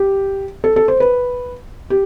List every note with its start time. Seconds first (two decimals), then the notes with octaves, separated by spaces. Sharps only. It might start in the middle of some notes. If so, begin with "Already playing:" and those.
Already playing: G4
0.64 A4
0.76 A4
0.88 C5
1.00 B4
1.90 G4